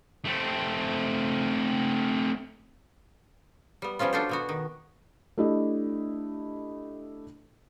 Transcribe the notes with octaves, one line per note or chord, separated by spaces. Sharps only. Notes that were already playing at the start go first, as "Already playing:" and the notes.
A3 C4
G3 B3
F3 G3 B3 C#4 F4
D4 F4 F#4 A4 C5
B2 B3 F#4
D#3
A3 D4 E4 G4 D#5